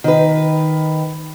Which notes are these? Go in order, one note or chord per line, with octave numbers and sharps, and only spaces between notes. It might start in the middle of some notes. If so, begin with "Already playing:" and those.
D#3 B4